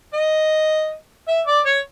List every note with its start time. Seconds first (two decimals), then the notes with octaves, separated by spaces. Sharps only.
0.14 D#5
1.28 E5
1.47 D5
1.66 C#5